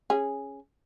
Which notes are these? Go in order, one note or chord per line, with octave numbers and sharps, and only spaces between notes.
C#4 G#4